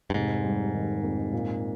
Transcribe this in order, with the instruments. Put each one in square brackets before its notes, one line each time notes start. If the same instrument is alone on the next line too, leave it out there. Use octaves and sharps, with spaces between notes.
[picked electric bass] G2
[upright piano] F1 [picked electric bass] G#2
[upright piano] G3
D#3
F2
A#2